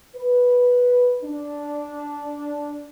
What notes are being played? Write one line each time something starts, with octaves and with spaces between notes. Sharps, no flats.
B4
D4